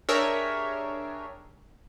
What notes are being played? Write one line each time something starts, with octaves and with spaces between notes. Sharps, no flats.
D4 G4 G#4 A#4 C#5 E5